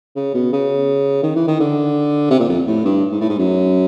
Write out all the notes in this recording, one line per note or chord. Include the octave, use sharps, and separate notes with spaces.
C#3
B2
C#3
D#3
E3
D#3
D3
C3
A#2
F2
A2
G2
G#2
A2
G#2
F#2